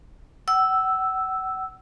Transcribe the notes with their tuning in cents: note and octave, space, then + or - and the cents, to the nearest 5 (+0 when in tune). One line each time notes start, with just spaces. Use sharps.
F#5 +35 E6 +0